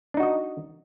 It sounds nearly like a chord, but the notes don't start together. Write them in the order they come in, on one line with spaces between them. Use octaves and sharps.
D4 D#4 F#4 D#5